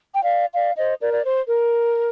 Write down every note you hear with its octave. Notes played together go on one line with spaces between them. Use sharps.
G5
D5 F5
D5 F5
C5 D#5
A#4 D5
D5
C5
A#4